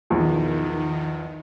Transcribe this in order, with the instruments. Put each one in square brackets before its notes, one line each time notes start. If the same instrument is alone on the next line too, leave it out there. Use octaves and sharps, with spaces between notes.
[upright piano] B1 E2 F3 [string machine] D#3